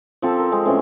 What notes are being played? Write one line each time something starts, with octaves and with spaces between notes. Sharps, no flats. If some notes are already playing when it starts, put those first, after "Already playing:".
F3 C4 A4
A#4
G#3 C4
A2 E3 C4 C#4